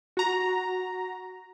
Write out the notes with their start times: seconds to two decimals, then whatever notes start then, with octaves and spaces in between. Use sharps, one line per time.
0.17 F#4 A#5